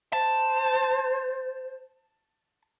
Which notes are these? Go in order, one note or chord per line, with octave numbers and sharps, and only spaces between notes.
C5 A5